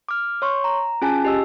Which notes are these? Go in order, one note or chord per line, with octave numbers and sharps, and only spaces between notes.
D6 F6
C#5 C6 C#6
A#5
C#4 F4 G#4 G#5 A5
G4 D#5 E6